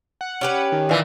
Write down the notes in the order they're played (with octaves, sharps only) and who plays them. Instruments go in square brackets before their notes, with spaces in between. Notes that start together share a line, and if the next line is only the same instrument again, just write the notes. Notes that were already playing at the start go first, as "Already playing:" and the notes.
[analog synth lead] F#5
[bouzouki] C#4 G4 B4
[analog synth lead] D#3
[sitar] A#2 E3